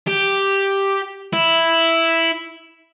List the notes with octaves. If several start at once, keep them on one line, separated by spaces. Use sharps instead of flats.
G4
E4